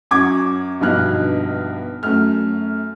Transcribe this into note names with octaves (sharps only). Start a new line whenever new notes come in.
F#2 C#6 D6 G#6
A#1 G2 B2 D#4 F6 F#6
F#2 A3 F6